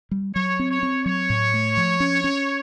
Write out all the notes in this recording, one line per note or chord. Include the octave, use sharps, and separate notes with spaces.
G3
F#3 C#5
C4
C#5
C4
F#3 C#5
A2
A3
F3
C#4
C#4